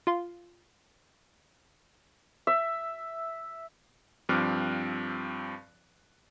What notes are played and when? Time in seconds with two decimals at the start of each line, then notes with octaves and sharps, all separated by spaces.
0.07 F4 F5 C6
2.47 E5
4.29 G2 F3 C4 D6 F6 F#6